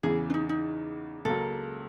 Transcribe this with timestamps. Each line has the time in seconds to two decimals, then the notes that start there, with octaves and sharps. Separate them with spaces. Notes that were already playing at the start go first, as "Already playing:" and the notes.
0.03 E2 C#3 E3 G#4
0.30 D4
0.34 D#4
0.49 D#4
1.25 C#2 C#3 F#3 A#3 A4